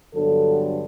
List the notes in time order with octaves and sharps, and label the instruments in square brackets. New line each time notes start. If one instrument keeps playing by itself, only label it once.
[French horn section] G2 D3 F#3 B3 D4 A4